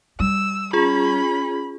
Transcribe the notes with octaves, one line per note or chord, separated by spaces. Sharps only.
G3 E6
C#4 F4 G#4 B5